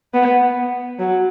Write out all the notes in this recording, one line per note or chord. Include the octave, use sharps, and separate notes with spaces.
B3
F#3